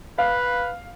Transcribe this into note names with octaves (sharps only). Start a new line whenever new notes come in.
B4 F5